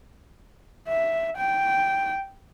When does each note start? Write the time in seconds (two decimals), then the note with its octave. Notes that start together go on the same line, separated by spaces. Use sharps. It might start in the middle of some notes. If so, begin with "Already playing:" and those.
0.88 E5
1.37 G5